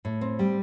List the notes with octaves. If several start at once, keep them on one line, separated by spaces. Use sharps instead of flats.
A2
C4
G3